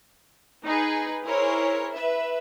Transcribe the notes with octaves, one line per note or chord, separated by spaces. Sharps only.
D#4 G#4 B4
E4 G#4 A#4 C5 C#5
B4 E5